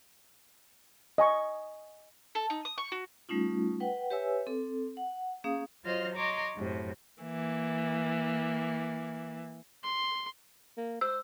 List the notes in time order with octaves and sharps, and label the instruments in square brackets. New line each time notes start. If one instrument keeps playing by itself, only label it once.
[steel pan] D#5 G#5 C#6
[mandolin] A4
D#4
D#6
C#6
F#4
[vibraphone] G3 A3 C#4 D#4 F4
B4 F#5 G5
G4 B4 C#5 E5 G#5 E6
C4 A4
F#5
A#3 C#4 G#4 F5 D#6
[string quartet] F#3 F4 C5 D#5 C6 F6
C#5 D#5 A#5 C6 D6
F#2 A2 C3
[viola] E3 A#3
[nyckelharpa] C6
[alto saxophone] A#3
[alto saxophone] C5 [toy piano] E6